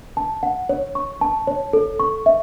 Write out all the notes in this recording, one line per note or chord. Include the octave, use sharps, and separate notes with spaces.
A5
F#5
C#5
C#6
A5
C#5
A4
C#6
E5